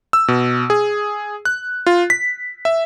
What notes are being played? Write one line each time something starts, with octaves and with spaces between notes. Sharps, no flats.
E6
B2
G#4
F#6
F4
B6
E5